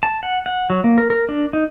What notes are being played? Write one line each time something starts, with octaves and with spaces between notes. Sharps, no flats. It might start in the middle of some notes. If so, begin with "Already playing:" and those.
A5
F#5
F#5
F#3
A#3
A#4
A#4
D4
D#4